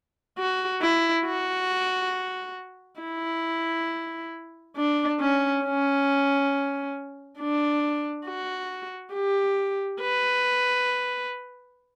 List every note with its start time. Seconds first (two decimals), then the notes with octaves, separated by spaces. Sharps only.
0.38 F#4
0.82 E4
1.25 F#4
3.01 E4
4.76 D4
5.20 C#4
5.64 C#4
7.39 D4
8.26 F#4
9.14 G4
10.01 B4